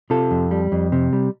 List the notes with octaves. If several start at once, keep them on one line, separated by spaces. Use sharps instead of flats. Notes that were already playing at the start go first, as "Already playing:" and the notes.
C3 F4 A4
F2
G3
F2
C3
G3